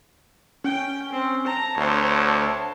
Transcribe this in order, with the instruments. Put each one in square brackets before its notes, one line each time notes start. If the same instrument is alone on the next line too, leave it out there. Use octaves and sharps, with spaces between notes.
[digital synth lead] C#4 [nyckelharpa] G5
[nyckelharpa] C4
[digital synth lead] A5 [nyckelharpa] A#5
[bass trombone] D2 [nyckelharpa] C5 C#5